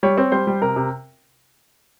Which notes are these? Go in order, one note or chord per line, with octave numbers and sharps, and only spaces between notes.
G3 C#5
C4
G3 C5
G3
C3 A#4
C3